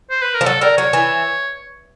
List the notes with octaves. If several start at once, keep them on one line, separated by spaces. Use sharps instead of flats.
C5
B4
A#4
F3
F#3 A4
G3 A#4
F#3 C#5
E3